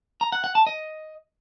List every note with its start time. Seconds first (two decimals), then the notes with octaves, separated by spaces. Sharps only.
0.21 A#5
0.32 F#5
0.44 F#5
0.55 A5
0.67 D#5